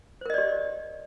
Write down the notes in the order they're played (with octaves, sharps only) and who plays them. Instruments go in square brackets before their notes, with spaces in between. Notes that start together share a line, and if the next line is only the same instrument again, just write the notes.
[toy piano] C5
A#4
D#5
D5
G4